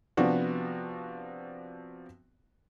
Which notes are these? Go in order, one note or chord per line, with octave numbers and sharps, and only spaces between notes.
C3 F3 B3 D4 F#4